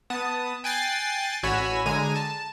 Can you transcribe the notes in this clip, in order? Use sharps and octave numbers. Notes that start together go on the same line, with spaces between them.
B3 A5 D#6
G5 G#5 F#6 A6 C7
A1 F#4 C#5 G#5 B5 E6
D3 G#3 G#5 A#5 D#7
A5